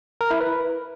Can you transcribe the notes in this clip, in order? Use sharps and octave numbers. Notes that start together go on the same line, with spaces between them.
A#4
E4
B4